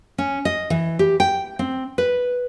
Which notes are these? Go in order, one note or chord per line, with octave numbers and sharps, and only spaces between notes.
C#4
D#5
E3
G4
G5
C4
B4